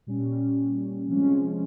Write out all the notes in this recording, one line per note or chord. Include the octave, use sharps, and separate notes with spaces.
A#2 G3 C#4
C3 F3 G#3 C#4